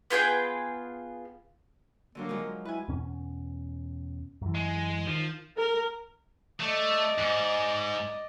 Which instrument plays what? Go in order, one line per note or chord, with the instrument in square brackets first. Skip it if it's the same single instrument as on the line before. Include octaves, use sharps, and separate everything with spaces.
[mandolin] B3 F4 G#4 G5
[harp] D3 F#3 D4 [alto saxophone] A#3
[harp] F3 F#3 G#3
[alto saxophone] E4 [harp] B4 G#5
[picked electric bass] E2 B2 C#4
F#2 E3
[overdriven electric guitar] G#3
[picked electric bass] D#3 [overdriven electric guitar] F3
[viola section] A#4
[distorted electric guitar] A3 [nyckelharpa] D5 D#5
[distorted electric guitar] G#2